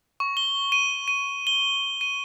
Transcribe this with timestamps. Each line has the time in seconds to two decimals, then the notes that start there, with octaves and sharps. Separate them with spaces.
0.20 C#6
0.37 G7
0.72 D#7
1.08 D#7
1.47 G7
2.01 D#7